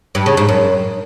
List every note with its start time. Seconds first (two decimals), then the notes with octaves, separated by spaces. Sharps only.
0.15 G2
0.26 C#3
0.37 G#2
0.49 F#2